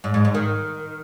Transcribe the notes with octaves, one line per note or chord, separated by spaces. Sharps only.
G#2
G#2
G#2
D#3